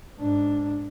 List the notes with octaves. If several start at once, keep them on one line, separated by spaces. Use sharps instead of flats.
G#2 D4